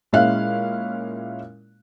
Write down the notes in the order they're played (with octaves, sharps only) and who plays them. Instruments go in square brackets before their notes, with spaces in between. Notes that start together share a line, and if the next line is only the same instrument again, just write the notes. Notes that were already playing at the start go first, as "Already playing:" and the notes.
[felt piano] A#2 G#3 C#4 E4 F5 F#6